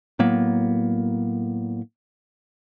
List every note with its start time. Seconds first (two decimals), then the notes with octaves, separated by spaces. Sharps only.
0.19 A2 F#3 A#3 B3